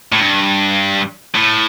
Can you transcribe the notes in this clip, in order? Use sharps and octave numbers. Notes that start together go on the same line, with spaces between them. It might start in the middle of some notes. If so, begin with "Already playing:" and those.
A2
G2
A2